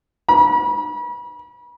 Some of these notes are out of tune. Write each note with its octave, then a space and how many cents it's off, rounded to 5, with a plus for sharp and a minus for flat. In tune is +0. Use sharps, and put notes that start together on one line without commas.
B5 -40